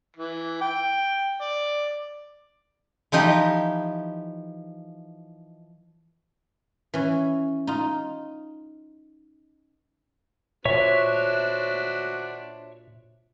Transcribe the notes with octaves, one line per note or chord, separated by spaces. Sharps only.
E3
G5
D5
E3 F3 D#4 G4
E3 C#4
D#4 F4
A#2 D4 F#4 C5 C#5 E5 C#6